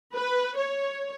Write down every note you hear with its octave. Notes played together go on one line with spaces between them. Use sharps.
B4
C#5